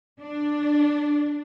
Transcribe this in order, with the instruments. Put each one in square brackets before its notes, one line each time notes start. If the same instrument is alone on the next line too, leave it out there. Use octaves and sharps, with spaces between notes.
[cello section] D4